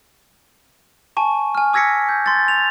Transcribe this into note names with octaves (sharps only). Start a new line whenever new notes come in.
G#5 A5 C#6
G#5 F6
D6 E6 G#6 A#6 B6 C#7
G6
C6 A6
F7